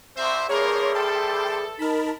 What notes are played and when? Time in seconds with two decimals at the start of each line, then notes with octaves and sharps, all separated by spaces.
0.17 C2 C4 C5 E5
0.49 E3 G3 A#3 D4 G#4 A#4 C#5 C6
0.95 A4 G5 A5 C6
1.79 D#4 A#4 A5 B5